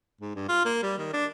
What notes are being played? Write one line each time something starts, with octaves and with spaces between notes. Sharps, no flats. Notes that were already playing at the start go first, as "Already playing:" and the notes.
G#2
G2
F4
A#3
G3
D#3
D4